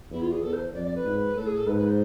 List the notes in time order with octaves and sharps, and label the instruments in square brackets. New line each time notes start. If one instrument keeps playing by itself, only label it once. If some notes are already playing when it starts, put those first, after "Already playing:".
[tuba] E2 [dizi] E4
[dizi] F4
G#4
[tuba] E2 [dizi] A4
[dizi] C5
[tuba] F2 [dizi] D5
[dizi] D5
B4
[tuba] G#2
[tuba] A2 [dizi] A4
[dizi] G#4
A4
[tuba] G#2 [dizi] B4
[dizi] B4
C5